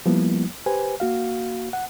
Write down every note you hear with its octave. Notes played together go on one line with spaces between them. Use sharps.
F3 G3 A#3 B3 E4
G4 B4 C5 G#5
A#3 F#4 F5
F#5